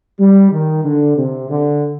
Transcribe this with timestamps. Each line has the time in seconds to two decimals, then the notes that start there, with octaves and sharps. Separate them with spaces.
0.19 G3
0.52 D#3
0.84 D3
1.17 C3
1.49 D3